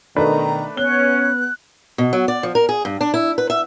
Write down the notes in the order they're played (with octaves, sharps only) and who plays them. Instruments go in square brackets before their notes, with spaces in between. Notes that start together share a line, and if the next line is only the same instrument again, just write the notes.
[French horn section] B2 D#3 [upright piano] A3 D4 B4 [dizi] A#5
[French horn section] B3 [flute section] C#4 C#5 [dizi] F#6 [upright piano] G7
[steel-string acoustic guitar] B2
F#3
D5
F3
A#4
G#4
G2
D4
E4
B4
E5